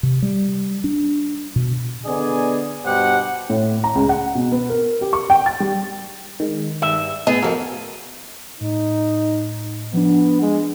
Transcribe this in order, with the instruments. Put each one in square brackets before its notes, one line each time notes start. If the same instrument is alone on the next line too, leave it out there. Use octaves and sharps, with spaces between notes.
[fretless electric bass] C3
G3
D4
B2
[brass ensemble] D3 B3 G#4 D5 D#5 G#5
G2 B2 G4 C5 F#5
[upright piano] A2
A#5
C#2
F#5
B2
B3
A#4
G4
C#6
G5
A6
G3
[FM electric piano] D#3 G#3
[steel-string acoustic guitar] G2 [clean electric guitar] E5
[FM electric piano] A2 [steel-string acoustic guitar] B3 [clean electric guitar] G#4 [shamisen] D#5
[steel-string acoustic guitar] F2 F3 [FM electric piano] F#4 A4 A#4
[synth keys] A2 [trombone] D#4
[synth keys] F3 D4 [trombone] B3
[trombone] G#3